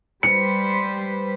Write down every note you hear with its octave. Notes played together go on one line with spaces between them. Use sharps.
G3 B4 C5 C#7